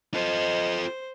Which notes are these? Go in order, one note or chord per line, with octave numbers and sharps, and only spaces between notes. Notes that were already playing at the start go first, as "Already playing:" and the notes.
F4 A4 C5 D#5